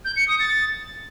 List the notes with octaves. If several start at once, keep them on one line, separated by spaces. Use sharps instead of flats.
G6
C#7
D#6
A6